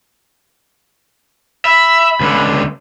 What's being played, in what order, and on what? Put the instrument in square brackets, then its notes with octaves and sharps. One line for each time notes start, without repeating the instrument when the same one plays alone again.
[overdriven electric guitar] E5 [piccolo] B5
[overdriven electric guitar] C#2 D3